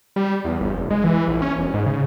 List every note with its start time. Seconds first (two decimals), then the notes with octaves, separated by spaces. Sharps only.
0.16 G3
0.45 E2
0.60 G1
0.74 F1
0.91 G#3
1.04 E3
1.28 A#1
1.42 C#4
1.59 E1
1.74 G#2
1.86 C#3